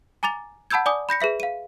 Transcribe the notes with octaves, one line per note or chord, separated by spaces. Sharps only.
G#5 A#5 D6 A6 F7
F#5 A5 B5 E6 G6 G#6
D5 G#5 D6 D#6
B5 G6 A#6 C#7
G#4 B4 E5 B6
F5 D#7